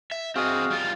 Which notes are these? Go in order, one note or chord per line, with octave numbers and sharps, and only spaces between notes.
E5
C4 F#4 G#4 D#5 F5
G3 F4